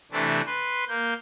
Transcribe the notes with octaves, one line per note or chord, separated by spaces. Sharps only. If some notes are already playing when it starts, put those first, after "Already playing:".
C3 E3 A3 C4 D4
B4 C6
A#3 G6